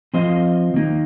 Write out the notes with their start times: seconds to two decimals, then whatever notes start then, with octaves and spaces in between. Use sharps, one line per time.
0.14 F3 C4 F4 C5 D#5
0.74 D#3 A#3 D#4